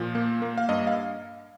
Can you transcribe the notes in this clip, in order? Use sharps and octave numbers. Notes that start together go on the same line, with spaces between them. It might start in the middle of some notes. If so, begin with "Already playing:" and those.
Already playing: A#2 F3
A#3
A#3
F5
G2 D#5
F5